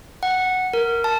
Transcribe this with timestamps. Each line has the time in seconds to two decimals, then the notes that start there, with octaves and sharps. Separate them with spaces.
0.23 F#5
0.73 A#4
1.04 A5